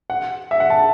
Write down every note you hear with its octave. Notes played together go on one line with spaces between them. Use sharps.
F#5
E5
F#5
A5